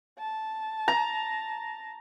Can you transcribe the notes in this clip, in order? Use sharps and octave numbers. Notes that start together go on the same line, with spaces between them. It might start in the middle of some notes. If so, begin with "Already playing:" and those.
A5
A#5